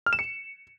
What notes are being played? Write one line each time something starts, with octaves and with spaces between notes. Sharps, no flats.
F6
E7
C#7